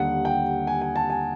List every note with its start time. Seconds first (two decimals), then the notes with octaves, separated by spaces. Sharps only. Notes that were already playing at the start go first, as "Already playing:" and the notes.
Already playing: D#2 D3 G3 F#5
0.25 G5
0.67 G#5
0.81 G#5
0.96 A5
1.10 G#5